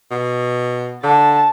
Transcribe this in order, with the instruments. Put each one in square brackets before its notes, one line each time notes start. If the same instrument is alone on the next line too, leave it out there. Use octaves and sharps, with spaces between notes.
[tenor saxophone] B2
[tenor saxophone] D3 [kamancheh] A5